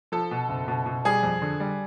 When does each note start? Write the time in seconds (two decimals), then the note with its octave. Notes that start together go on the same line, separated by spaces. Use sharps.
0.12 F3 A4
0.31 B2
0.49 F#1
0.68 B2
0.86 B2
1.05 G3 G#4
1.23 F2
1.42 D3
1.60 G3